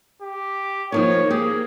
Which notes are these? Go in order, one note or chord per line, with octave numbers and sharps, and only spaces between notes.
G4
D3 D#3 F3 A#3 C#5
G4 G#4